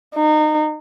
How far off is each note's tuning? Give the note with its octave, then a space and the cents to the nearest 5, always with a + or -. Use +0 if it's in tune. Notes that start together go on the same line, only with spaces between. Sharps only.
D#4 -25